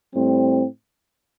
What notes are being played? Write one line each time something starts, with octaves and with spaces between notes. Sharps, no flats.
A2 G3 C4